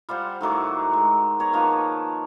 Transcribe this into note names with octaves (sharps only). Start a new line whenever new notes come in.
G3 F4 C5 F#5
A2 D#3 F#3 D6
G#3
B3 C#5 A#5
D#3 F3 A#3 B4